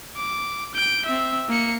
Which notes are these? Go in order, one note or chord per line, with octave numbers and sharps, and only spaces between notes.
D6
G6 D7
C4 E5
A#3 C#7